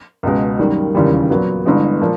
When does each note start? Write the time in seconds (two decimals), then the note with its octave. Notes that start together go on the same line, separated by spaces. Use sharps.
0.23 C#2 B2 G#3
0.59 F#2 D#3 G3 A#3
0.95 E1 D#2 C#3 E3 G3
1.30 A#2 F#3 B3
1.65 G1 G2 E3 G#3 B3
2.01 A#2 F3